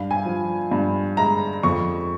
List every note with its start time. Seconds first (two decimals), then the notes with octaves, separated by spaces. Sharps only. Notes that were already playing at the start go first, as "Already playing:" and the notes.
Already playing: G2 F5
0.11 G#5
0.25 F3
0.71 G2
1.17 G#3 A#5
1.63 F2 C#6